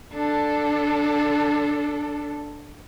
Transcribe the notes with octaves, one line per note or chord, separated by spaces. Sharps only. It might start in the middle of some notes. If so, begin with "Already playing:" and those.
D4 A4